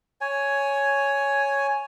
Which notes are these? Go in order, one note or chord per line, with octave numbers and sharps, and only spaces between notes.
C#5 G#5